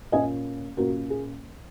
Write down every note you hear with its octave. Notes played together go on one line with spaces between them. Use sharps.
A#2 A#3 C#4 D#5 G#5
A#2 A#3 C#4 F#4 A#4
G#4